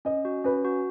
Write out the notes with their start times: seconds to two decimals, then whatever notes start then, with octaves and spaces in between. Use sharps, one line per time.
0.05 C#4 D#5
0.25 F#4
0.44 C#4 B4
0.65 F#4